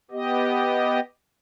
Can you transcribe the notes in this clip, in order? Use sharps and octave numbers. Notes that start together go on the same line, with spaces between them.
B3 G4 D#5